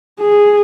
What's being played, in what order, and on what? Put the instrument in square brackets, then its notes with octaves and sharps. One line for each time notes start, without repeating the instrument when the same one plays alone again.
[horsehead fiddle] G#4